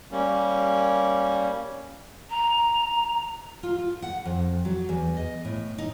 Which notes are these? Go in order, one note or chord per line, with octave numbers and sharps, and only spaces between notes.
G3 A#3 C#4
A#5
F4
F4
F#5
F2
F#3
E2
D#5
A2
D#4